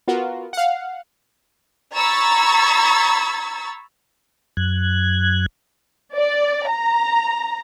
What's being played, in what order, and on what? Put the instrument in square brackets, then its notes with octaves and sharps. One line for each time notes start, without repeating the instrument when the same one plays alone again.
[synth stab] B3 F4 F#4 A#4
F5 F#5
[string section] A#5 B5 C#6 E6 G#6 A6
[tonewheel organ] F#2 F#6 G#6
[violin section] D5
A#5